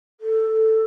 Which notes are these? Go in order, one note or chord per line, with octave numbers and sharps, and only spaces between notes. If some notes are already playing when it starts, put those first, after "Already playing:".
A4